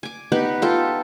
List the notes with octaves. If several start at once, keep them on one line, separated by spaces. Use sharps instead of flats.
G#5 D6
B3 D#4 G4 B4
F4 A4 G5